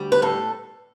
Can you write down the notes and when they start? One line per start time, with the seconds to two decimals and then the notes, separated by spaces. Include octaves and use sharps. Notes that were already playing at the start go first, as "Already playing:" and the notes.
Already playing: D2 G3
0.12 B4
0.22 A2 A4